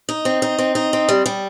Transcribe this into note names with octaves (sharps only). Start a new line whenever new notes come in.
D#4
C4
D#4
C4
D#4
C4
G3
G3